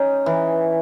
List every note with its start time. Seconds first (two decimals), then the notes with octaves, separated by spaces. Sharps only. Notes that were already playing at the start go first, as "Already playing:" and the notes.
Already playing: C#4 D#4
0.26 E3